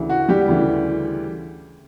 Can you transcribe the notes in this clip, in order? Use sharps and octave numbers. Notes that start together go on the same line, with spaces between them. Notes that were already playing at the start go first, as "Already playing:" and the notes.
Already playing: D2 C#3 E3
F#4
G3 G4
D2 C#3 E3